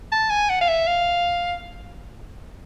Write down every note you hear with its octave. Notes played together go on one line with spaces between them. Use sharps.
A5
G#5
F#5
F5
E5
F5